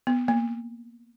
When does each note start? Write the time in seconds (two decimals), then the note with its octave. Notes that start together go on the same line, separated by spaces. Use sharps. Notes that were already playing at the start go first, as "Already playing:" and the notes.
0.07 B3
0.28 A#3